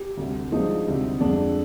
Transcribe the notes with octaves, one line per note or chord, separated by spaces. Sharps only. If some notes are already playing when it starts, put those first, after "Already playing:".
Already playing: G4
D2 C3 G3
G2 F3 G#3 D#4
D2 C3 G3
F2 D3 G#3 D4